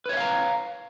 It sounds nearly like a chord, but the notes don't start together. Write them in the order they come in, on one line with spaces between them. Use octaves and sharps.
B4 C#5 E5 F5 A#5